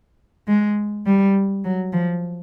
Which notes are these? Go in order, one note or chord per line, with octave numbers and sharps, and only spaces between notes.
G#3
G3
F#3
F3